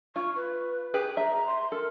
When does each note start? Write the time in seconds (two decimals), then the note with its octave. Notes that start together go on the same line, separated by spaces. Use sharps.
0.16 F4 C#6
0.36 B4
0.94 G4 G#4 B4
1.17 E5 A#5
1.47 C6
1.72 A4 A#4